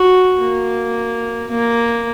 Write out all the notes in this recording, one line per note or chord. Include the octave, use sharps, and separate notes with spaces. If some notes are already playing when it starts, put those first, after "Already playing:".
Already playing: F#4
A#3
A#3